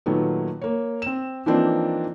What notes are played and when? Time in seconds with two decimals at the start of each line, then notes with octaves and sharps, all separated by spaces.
0.06 A#2 D#3 F#3 A3 B3
0.61 A#3 C#5
1.02 C4 E7
1.46 E3 F3 A#3 C4 D4 D#4